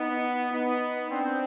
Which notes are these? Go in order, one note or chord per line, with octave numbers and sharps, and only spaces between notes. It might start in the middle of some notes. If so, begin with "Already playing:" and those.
Already playing: B3 D#4
B3 D#4
C4 D4